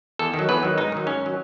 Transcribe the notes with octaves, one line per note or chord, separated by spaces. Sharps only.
E2 A4
D#3
F#3
E2 B4
D#3 F#3
G#2 D#4
D#3 F#3
G#2 C#4
D#3 F#3